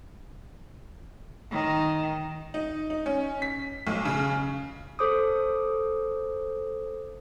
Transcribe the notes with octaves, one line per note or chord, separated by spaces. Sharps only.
D#3
D#4
D#4
C#4
B6
B1
C#3
A4 C5 D6 D#6